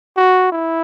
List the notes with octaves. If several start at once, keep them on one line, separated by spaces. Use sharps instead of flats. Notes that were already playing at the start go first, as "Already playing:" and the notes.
F#4
E4